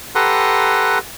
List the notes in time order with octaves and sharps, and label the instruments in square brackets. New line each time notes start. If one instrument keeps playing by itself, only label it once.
[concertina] G4 A4 B4 F#5 A#5 C6